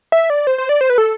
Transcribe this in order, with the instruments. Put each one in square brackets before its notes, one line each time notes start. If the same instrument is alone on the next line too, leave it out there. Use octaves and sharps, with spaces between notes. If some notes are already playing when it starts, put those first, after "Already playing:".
[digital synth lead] E5
D5
C5
C5
D5
C5
B4
A4